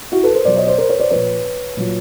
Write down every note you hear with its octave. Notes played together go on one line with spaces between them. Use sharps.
E4 F#4
A4 B4
A#4 C5
B2 F#3 C5 D5
C#5 D#5
C5 D5
A#4 C5
B4 C#5
C5 D5
A#2 F3 B4 C#5
A#2 F#3